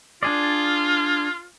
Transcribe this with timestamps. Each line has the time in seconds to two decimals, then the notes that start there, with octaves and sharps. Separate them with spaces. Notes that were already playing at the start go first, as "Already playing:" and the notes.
0.23 D4 F4 G#4 D5